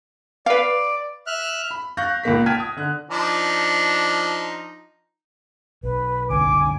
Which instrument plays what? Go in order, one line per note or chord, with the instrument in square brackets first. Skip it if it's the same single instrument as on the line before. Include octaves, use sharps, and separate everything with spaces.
[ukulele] B4 F5 [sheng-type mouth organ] D5
[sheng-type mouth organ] E5 F6 F#6
[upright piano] B5
F5 C#6 F#6 G6 A#6
C#2 A#2 A#3 B6
G5 A5 F6 G#6 B6 D#7
D#6
D3 F#6
[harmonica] F3 D4 D#4
[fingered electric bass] B1 [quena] B4
[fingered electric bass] F#1 C2 D3 [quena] G#5 [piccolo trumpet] D6